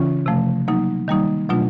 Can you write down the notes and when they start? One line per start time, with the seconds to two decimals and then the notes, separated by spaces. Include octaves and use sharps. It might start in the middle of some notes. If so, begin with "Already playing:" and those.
Already playing: C#3 E3 C#4 F4
0.26 C3 F3 A3
0.68 F#3 A#3 D#4
1.08 D#3 G3 A#3 D#4
1.49 B2 F#3 A3 D4 F4